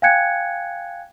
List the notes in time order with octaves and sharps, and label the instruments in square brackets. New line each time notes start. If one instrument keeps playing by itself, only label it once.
[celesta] F5 G5 G#5 F#6 G#6 C#7